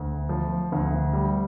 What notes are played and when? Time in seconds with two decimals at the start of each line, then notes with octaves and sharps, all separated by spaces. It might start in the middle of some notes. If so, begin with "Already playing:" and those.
Already playing: D2
0.29 F3
0.72 D2
1.13 G3